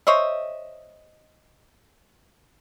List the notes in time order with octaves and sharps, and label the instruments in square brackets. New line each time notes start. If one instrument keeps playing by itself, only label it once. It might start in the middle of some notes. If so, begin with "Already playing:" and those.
[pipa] C5 C#5 D#5 E5